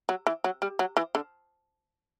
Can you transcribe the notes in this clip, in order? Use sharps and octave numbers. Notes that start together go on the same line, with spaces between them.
F#3
E3
F#3
G3
F#3
E3
D3